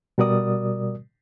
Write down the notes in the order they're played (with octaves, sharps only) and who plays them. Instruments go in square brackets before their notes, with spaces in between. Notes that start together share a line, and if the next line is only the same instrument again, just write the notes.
[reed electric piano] B2 G3 F#4 A#4 D5 D#6